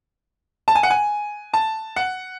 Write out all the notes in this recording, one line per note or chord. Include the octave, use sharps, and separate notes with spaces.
A5
G#5
F#5
G#5
A5
F#5